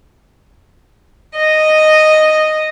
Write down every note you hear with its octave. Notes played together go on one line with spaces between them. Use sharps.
D#5